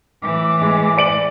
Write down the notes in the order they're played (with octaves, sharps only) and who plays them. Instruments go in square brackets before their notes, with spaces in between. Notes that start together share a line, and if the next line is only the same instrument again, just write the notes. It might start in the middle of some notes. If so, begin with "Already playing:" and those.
[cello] A2 E3 [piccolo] D6
[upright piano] G#3
D5 D7 F#7